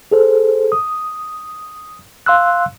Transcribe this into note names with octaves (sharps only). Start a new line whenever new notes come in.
G#4 A4 C5
D#6
F5 C6 E6 F#6